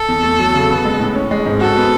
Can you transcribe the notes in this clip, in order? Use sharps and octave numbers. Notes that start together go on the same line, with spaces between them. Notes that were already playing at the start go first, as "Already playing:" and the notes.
Already playing: A4
E2
A3
F#3
C#3
B3
G#3
A2
C#4
G#3
G#2
F#4 A4
B3